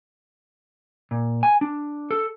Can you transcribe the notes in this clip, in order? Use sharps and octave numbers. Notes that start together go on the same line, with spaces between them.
A#2
G#5
D4
A4